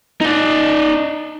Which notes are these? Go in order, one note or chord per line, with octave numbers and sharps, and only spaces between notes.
D#4 D5